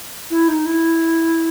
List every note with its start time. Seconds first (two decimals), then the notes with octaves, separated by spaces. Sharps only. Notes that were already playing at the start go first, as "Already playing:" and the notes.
0.31 E4
0.48 D#4
0.66 E4